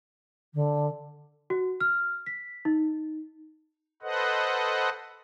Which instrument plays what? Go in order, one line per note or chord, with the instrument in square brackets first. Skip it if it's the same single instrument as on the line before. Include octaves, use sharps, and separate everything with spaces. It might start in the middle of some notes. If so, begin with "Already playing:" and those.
[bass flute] D3
[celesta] F#4
F6
B6
D#4
[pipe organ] A4 B4 C5 D#5 F#5